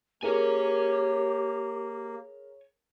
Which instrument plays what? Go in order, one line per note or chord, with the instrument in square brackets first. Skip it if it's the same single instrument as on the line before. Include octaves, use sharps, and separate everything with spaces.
[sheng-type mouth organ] A#3 [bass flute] G4 [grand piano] G#4 A#4 [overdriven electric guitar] C#5 G#5